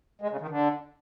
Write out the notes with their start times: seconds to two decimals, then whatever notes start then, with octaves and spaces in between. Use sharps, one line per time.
0.22 G#3
0.31 C#3
0.41 D#3
0.50 D3